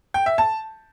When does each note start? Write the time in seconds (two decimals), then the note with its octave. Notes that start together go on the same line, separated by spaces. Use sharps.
0.14 G5
0.26 E5
0.38 A5